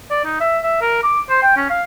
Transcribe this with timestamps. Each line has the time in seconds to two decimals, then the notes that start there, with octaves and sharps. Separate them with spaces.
0.10 D5
0.25 D#4
0.41 E5
0.64 E5
0.81 A#4
1.03 D6
1.29 C5
1.43 G5
1.57 C#4
1.70 F5